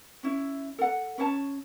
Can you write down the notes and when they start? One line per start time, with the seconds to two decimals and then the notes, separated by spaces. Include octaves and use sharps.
0.23 C#4 E4
0.78 A4 F#5
1.18 C#4 B4 C#5 A5